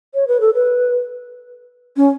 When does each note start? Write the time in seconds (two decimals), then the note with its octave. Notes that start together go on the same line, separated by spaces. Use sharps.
0.14 C#5
0.28 B4
0.41 A4
0.54 B4
1.97 C#4